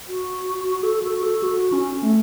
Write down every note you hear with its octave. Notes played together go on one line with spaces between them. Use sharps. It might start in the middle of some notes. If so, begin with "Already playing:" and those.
F#4
A4
F#4
A4
F#4
C#4
A3